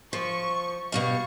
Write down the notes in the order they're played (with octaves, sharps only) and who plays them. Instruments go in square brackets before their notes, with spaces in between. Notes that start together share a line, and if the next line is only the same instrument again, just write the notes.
[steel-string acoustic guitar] F3 [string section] C#6
[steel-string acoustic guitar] B2 G3 F5 [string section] C#6